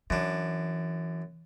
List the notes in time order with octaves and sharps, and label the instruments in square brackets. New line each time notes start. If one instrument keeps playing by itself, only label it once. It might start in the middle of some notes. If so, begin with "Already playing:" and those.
[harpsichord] F#2 D4 [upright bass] E3